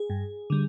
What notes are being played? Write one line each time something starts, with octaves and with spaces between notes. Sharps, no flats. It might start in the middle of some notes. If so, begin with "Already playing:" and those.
Already playing: G#4
G2
D3 G3